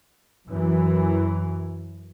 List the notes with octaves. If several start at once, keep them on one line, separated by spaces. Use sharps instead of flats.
F#2 E3